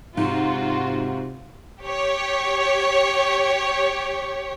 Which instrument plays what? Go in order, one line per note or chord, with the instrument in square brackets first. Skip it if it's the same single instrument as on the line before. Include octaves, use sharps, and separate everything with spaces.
[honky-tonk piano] G#2 [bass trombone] C3 [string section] F4 F#4
[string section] G4 C#5